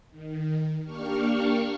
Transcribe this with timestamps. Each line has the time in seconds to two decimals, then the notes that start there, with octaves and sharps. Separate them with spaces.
0.11 D#3
0.84 A#3 D4 G4 C#6 F6